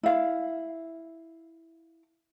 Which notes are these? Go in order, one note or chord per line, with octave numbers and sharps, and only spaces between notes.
E4 F5